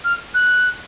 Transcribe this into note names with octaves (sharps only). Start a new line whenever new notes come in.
F6
F#6